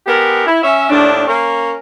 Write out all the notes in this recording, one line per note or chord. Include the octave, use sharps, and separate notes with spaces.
G#3 B3 G4 A#4
E4
C#4 E5
D#2 A2 D4
A#3 C#4 A#4